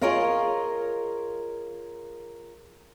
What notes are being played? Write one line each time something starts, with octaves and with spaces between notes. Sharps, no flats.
F4 G#4 A#4 C#5 D#5 F5